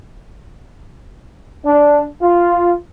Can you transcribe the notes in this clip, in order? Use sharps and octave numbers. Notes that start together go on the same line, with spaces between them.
D4
F4